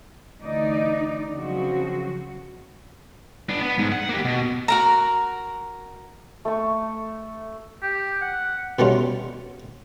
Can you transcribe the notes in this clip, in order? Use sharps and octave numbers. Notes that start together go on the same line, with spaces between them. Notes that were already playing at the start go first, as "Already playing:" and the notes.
D2 E3 D#4 D5
C#3 F3 F#3 C4 F#4
B3 D4
B3
G#2
F#5
A#3 G4
B2
F#4 A#4 A#5
A3 C#6
G4
F#5
B2 G3 A3 C#4 F4